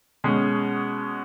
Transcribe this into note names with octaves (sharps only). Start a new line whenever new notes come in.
B2 G#3 C#4